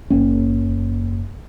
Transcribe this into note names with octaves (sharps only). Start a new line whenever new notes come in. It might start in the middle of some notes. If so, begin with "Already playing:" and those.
F#1 A#3 C#4